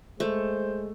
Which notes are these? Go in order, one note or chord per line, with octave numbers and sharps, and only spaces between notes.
G#3 A3 C5